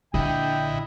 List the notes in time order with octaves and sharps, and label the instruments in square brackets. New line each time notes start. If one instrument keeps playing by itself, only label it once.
[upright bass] A#1 [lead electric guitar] D3 [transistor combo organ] E4 D#5 [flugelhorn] G5